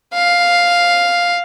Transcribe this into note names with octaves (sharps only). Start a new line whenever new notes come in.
F5